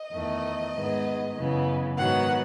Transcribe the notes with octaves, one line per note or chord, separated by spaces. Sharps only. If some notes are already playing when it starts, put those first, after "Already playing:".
Already playing: D#5
E2 D#3 A3
G#2 D#3 G#3 B3
F#2 C#3 E3 B3
G#2 D#3 F#3 B3 F#5